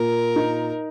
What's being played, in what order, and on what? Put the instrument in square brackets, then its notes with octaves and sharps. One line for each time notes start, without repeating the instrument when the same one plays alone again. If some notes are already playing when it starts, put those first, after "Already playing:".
Already playing: [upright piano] A#2 [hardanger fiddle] A#4
[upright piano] D#4